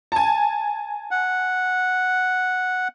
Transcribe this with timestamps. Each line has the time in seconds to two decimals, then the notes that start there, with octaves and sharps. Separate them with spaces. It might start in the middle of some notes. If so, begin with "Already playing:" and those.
0.12 G#5 A5
1.11 F#5